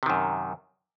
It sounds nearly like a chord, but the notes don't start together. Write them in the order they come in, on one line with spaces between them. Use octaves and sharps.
C3 D#3 F#2